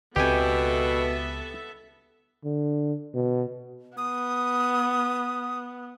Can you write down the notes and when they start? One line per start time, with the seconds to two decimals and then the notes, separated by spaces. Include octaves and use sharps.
0.16 C#2 B2 B3 C4 G4 A4 E5 G#5
2.45 D3
3.14 B2
3.97 B3 D#6